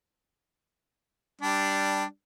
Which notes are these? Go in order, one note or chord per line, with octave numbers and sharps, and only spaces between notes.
G3 D4